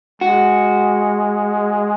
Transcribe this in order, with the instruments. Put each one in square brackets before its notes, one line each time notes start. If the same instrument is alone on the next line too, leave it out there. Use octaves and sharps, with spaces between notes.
[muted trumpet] G#3 [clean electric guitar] F#4